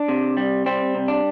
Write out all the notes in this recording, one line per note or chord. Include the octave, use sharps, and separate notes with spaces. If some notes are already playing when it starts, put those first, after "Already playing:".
Already playing: D4
C3
G3
G3 C4
C3
D4